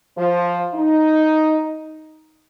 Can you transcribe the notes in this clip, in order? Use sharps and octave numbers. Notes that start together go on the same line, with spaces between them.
F3
D#4